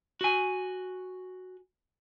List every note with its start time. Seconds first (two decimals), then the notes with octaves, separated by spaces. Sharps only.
0.21 F#4 G#5